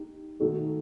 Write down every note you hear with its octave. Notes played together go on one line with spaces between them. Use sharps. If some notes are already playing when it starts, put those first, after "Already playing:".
Already playing: D#4 G4
D#3 A3 D#4 F#4 A4